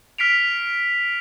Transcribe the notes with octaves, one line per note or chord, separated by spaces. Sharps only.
F6 B6 C7 D7 F7